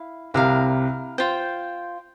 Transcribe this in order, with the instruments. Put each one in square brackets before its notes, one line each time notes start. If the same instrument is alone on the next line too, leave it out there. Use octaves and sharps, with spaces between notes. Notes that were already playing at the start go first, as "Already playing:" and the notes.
Already playing: [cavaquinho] E4 F5
[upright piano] C2 C3 [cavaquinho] E4 A#4 F5
[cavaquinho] F4 C5 G5